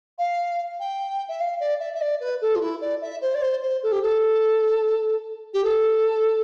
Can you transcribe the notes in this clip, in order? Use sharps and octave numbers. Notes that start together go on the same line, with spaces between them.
F5
G5
E5
F5
D5
E5
E5
D5
B4
A4
F4
E4
D5
E5
C5
D5
C5
C5
A4
G4
A4
G4
A4